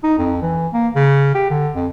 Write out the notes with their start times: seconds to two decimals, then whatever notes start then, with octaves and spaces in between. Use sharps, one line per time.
0.03 D#4
0.18 F2
0.42 E3
0.73 A#3
0.95 C#3
1.35 G4
1.50 D3
1.75 F2